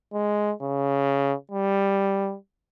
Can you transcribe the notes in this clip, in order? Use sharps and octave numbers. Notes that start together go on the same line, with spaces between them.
G#3
C#3
G3